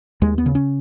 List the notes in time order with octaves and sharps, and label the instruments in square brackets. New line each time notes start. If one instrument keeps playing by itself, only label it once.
[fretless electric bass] D#2 G#3
B3
C#3
C#4